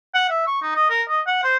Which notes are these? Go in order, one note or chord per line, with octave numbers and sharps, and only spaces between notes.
F#5
E5
C#6
D#4
D#5
A#4
D#5
F#5
C5